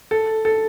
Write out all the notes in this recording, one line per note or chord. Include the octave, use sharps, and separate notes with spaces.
A4
A4